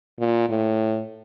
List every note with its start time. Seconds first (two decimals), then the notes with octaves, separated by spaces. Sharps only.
0.20 A#2
0.50 A2